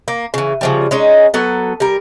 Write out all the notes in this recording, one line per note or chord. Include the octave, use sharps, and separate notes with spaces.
A#3
C#3 E3
C#3 F3 G3
G#3 C#4 D#4
F#3 B3 A4
G3 A#4